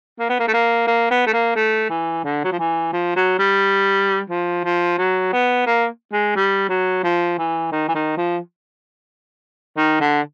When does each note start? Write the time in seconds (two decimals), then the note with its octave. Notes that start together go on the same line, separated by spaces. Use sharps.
0.19 A#3
0.30 B3
0.40 A#3
0.48 A3
0.54 A#3
0.87 A#3
1.11 B3
1.27 A3
1.33 A#3
1.56 A3
1.90 E3
2.24 D3
2.44 F#3
2.52 F3
2.59 E3
2.93 F3
3.16 F#3
3.39 G3
4.30 F3
4.65 F3
4.98 F#3
5.33 B3
5.67 A#3
6.13 G#3
6.36 G3
6.69 F#3
7.04 F3
7.38 E3
7.72 D#3
7.89 E3
7.95 D#3
8.17 F3
9.77 D#3
10.01 D3